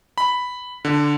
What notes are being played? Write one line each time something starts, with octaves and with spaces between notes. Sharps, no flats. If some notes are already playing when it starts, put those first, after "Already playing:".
B5
D3